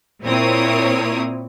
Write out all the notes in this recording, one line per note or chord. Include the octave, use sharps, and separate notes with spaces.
A#2 C4 E4 A#4 C#5 D#6